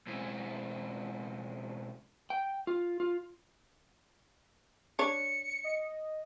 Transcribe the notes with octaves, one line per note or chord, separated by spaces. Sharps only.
B2 G#3 C4 C#4 E4
G5
F4
F4
D4 C#5 C#7
D#5